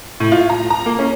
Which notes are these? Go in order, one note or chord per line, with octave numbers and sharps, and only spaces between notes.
A2
F4
A#5
A#5
A#3
C#4